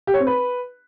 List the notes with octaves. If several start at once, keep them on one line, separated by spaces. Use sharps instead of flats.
G4
C#5
C4
B4